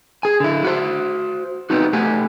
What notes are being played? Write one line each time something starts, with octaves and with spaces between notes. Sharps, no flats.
G#4 G#5
D3 E4
F#4 C5
B3 C4 D#4 F#4
A3 G4 F#5 G#5